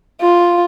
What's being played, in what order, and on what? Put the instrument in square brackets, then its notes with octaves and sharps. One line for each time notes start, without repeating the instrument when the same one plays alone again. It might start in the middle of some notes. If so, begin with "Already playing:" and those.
[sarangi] F4